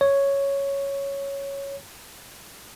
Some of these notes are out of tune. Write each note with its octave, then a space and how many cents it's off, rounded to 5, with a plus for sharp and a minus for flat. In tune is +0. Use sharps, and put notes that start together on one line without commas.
C#5 +0